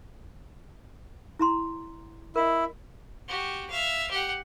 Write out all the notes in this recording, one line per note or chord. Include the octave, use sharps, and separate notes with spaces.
E4 A#5 C6
E4 A#4 D#5
F#4 G4
E5 F5
G4 F#5